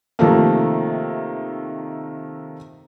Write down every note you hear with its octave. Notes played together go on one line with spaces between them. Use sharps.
C3 D#3 F3 A3 A#3